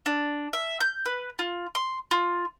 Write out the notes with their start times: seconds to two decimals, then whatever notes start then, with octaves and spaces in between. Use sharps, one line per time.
0.06 D4
0.53 E5
0.81 G6
1.06 B4
1.39 F4
1.75 C6
2.11 F4